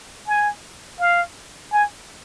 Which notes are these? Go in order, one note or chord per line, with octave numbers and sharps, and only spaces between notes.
G#5
F5
G#5